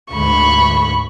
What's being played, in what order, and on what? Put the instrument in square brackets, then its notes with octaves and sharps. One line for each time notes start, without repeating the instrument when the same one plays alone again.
[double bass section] D2 G#2 [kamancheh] B5 C#6